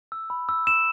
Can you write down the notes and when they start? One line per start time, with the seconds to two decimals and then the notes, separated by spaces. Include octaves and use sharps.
0.12 E6
0.30 B5
0.49 E6
0.67 E6 E7